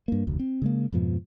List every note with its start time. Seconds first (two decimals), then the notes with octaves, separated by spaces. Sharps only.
0.08 G2 A#3
0.27 F1 D2
0.39 C4
0.62 C#3 G#3 A#3
0.92 F2 G#2 B2 F3